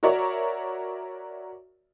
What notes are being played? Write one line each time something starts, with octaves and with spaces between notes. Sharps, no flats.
F#4 A#4 C#5 D5 E5 C#6